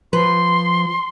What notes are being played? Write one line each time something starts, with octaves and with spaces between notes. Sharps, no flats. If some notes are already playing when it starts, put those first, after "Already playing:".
F3 B4 C6